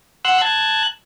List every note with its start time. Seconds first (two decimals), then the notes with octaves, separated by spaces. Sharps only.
0.25 F#5 C6 E6 F#6
0.42 A5 F#6 G#6